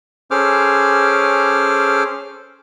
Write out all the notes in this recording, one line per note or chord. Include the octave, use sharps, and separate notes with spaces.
C#4 G#4 A4 C5 D6 F6